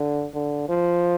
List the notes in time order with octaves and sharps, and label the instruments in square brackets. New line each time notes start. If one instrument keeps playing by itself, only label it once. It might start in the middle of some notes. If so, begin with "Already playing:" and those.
Already playing: [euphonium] D3
D3
F3